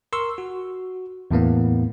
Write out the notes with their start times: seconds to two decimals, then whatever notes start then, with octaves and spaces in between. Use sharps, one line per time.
0.13 A#4 C6 C#6 E6
0.38 F#4
1.31 E2 A2 A#3 B3